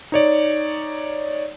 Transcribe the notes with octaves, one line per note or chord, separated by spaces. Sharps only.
D#4 C#5 D5